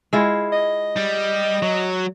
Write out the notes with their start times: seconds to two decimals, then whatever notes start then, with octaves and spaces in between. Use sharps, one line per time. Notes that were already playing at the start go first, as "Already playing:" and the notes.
0.13 G#3 E4 F4
0.52 D#5
0.97 G3
1.62 F#3